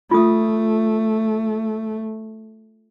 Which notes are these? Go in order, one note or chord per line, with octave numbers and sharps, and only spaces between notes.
A3 F4 D#6